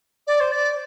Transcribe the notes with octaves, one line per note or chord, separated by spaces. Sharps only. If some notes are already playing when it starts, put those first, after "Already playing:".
D5
C5
D5